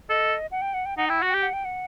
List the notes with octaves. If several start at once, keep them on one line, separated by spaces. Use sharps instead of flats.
A4 D#5
F#5
G5
F#5
G5
D#4 F#5
E4 G5
F#4 F#5
G4 G5
F#5
G5
F#5